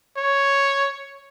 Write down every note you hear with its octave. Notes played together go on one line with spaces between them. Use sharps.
C#5